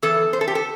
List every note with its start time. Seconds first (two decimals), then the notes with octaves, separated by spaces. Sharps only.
0.02 E2 E3 A4
0.33 C5
0.41 A4
0.48 G4
0.55 A4